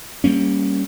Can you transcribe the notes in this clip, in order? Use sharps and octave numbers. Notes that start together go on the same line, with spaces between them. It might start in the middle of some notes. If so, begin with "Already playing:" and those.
G3 A3 A#3 C#4